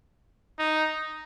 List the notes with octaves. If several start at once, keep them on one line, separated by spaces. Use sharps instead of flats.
D#4